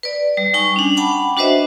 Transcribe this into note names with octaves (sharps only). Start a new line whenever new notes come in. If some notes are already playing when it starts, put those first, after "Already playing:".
B4 D5
G3
G3 D#4 G#5 C#6
C#4 D4
F#5 G5 A5 B5 D6
D4 F#4 B4 C5 D#5 E5